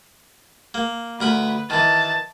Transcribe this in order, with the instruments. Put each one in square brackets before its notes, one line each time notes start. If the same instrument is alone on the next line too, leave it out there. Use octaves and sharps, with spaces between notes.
[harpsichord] A#3
[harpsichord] D2 A#4 B5 [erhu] B4
[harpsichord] D#3 E3 [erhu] A5